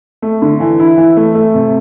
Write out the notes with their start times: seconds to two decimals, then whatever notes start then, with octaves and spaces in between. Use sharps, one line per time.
0.22 A3
0.42 D3
0.60 E3
0.80 E4
0.98 E3
1.17 A3
1.35 A3
1.54 C3